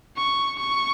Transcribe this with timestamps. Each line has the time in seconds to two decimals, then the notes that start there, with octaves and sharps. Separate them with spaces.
0.17 C#6
0.59 C#6